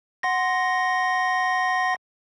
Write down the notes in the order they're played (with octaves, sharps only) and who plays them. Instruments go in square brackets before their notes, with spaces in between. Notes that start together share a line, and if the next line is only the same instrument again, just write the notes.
[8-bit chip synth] F#5 C6 A#6